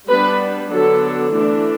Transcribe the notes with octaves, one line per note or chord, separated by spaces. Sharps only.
G3 B3 D4 B4
D3 F#3 B3 D4 A4
E3 A3 D4